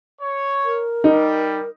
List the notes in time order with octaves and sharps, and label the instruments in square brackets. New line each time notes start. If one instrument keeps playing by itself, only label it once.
[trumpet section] C#5
[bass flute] A#4
[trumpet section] G3 [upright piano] D#4